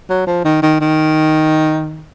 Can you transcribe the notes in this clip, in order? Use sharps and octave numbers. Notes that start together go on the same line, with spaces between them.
F#3
F3
D#3
D#3
D#3